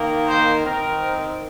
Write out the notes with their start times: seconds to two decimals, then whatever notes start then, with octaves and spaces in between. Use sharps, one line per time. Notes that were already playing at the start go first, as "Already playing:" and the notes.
Already playing: D#3 A#3
0.27 C5
0.64 D#3 C4 A#4